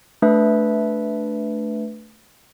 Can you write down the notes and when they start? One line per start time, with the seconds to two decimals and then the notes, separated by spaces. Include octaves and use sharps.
0.22 A3 D4 B4 E5